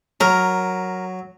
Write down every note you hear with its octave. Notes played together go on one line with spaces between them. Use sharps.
F#3 A#4